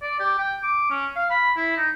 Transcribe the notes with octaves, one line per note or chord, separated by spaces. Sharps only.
D5
G4
G5
D6
C#4
F5
B5
E4
D#4